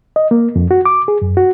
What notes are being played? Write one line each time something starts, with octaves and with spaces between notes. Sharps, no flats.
D#5
A#3
F2
F#4
D6
G#4
F#2
F#4